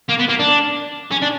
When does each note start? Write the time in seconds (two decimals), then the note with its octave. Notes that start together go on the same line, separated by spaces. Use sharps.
0.09 A#3
0.19 B3
0.29 A#3
0.39 D4
1.12 C#4
1.22 D4